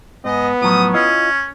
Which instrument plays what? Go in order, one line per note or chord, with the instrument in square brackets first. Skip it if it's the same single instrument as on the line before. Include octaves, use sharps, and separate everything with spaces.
[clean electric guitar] G#2 [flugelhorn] B3 [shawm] D#5
[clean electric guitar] A2 F3 F#3 [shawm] D#6
[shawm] C#4 [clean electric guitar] E4 F4 D#5